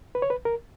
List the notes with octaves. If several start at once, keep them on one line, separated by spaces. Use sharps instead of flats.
B4
C#5
B4
A#4